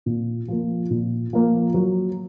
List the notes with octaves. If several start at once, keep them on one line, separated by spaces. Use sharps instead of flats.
A#2
F3 A#3
A#2
F3 A#3
F#3